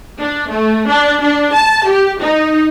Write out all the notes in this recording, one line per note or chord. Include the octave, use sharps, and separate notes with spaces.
D4
A3
D4
D4
A5
G4
D#4